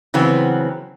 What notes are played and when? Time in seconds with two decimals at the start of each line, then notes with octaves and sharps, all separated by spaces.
0.14 C#3 E3 F#3 B3 C4